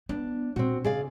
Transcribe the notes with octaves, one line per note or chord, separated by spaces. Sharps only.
B3 D4
A#2 C4 F#4
C#3 G#4 D5 F5